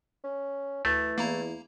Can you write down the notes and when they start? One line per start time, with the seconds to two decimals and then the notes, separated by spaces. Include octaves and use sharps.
0.24 C#4
0.85 D2 E3 A3
1.18 E2 A#3 E4 A#5